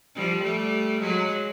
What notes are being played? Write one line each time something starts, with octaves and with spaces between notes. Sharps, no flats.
F3 G3
G3 A3
F#3 G#3